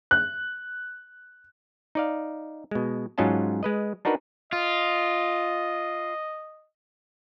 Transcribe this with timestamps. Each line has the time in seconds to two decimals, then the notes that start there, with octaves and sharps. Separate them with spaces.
0.11 F#6
1.95 D#4 D5 F5
2.71 B2 G#3
3.18 G#2 F#3 C#4 F4 D#5 A5
3.63 G#3 B4 D#5
4.05 D4 D#4 F#4 A#4 B4
4.53 F4 D#5